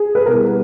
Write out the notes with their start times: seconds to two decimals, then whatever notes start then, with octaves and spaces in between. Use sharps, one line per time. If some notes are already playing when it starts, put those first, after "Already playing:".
Already playing: G#4
0.15 B4
0.26 B2 G3 B3 E4 A#4